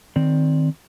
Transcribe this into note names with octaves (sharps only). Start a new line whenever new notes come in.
D#3 C4 D5